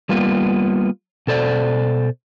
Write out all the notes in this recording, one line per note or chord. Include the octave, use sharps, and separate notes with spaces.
G3 A#3 B3 F4
B2 A4 C5 D5